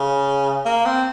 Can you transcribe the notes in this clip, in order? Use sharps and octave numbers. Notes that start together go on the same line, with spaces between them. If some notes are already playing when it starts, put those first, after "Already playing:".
Already playing: C#3
A#3
C4